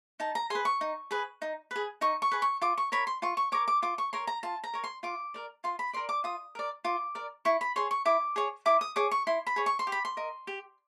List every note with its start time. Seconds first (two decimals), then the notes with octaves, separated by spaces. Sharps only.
0.20 D#4 A5
0.35 A#5
0.50 G#4 B4 C6
0.65 C#6
0.81 D#4
1.11 G#4 B4
1.42 D#4
1.71 G#4 B4
2.01 D#4 C#6
2.22 C#6
2.32 G#4 B4
2.42 C#6
2.62 F4 D6
2.78 C#6
2.92 A#4 C#5 B5
3.07 C6
3.22 F4 C#6
3.37 C#6
3.52 A#4 C#5 D6
3.68 D6
3.82 F4 D6
3.98 C#6
4.13 A#4 C#5 C6
4.27 A#5
4.43 F4 A5
4.64 A#5
4.73 A#4 C#5
4.84 C6
5.03 F4 D6
5.34 A#4 D5
5.64 F4 C6
5.79 B5
5.93 A#4 D5 C6
6.09 D6
6.24 F4 D#6
6.55 A#4 D5
6.85 F4 D6
7.15 A#4 D5
7.45 E4 C#6
7.61 B5
7.76 G#4 C#5 C6
7.91 C#6
8.05 E4 D6
8.36 G#4 C#5
8.66 E4 D6
8.81 D#6
8.96 G#4 C#5 D6
9.11 C#6
9.27 E4 C6
9.47 B5
9.56 G#4 C#5
9.66 C#6
9.79 C6
9.87 G4
9.92 B5
10.05 C6
10.17 A#4 D#5
10.47 G4